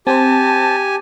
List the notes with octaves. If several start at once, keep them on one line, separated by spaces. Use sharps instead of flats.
C4 G4 C5 G#5 A5